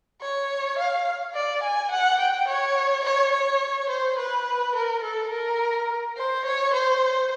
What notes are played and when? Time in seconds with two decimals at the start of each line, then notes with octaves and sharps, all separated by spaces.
0.22 C#5
0.79 F5
1.35 D5
1.63 G#5
1.91 F#5
2.20 G5
2.48 C#5
3.05 C#5
3.33 C#5
3.90 C5
4.18 B4
4.76 A#4
5.03 A4
5.31 A#4
6.17 C5
6.45 C#5
6.74 C5